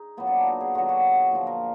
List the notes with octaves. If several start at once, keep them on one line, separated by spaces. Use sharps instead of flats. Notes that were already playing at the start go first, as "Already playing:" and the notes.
Already playing: D#4 G#4
A#2 F#3 B3
D4
D#4
F#4
G#4
D3 F#3 F#4
F#4
A#2 F3
A#4